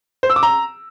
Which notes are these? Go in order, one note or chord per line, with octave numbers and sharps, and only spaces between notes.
C5
E6
D6
A#5